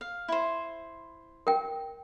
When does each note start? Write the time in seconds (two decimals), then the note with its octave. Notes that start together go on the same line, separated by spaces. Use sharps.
0.01 F5
0.28 E4 C5
1.47 A#4 G5